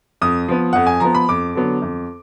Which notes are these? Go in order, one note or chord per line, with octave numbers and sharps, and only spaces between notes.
F2 D#6
F3 B3
F2 F#5
G#5
F3 B3 A#5
B5
F2 D6
D3 F#3 B3
F2